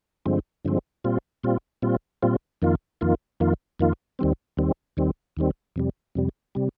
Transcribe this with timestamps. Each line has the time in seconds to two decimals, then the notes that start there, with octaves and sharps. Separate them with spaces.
0.26 G2 D3 F3 G#3 C4
0.65 G2 D3 F3 G#3 C4
1.04 A#2 G3 C4 F4
1.43 A#2 G3 C4 F4
1.82 A#2 G3 C4 F4
2.23 A#2 G3 C4 F4
2.62 F2 D#3 A#3 F4
3.01 F2 D#3 A#3 F4
3.40 F2 D#3 A#3 F4
3.80 F2 D#3 A#3 F4
4.19 D#2 D#3 G3 C4
4.57 D#2 D#3 G3 C4
4.97 D#2 D#3 G3 C4
5.37 D#2 D#3 G3 C4
5.76 F2 C3 G3
6.15 F2 C3 G3
6.55 C3 G3